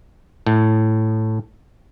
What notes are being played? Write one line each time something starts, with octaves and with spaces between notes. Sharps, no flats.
A2